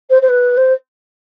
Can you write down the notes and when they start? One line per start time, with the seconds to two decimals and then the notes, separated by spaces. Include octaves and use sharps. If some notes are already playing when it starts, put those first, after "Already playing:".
0.10 C5
0.22 C5
0.29 B4
0.57 C5